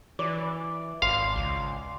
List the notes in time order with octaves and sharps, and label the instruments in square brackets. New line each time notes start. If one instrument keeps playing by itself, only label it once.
[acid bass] E3 [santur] D5
[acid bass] G#1 [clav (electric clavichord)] F5 [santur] C6
[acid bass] C#2